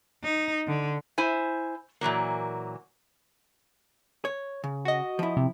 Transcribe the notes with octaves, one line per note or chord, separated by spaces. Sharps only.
D#4
D3
E4 C5 G#5
A#2 E3 F#3 A#3
C#5
C#3
F#4 D#5
F3 E4
C3